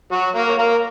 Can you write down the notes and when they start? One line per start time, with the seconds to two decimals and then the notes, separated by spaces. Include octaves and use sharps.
0.12 F#3 F#4
0.35 A#3 A#4
0.48 C#5
0.58 A#3 A#4